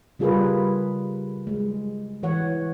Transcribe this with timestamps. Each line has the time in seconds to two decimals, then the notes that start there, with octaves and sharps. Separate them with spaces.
0.19 C#3 G3 F4 G#4 A#4 B4
1.47 G#3
2.23 E3 C#5 F#5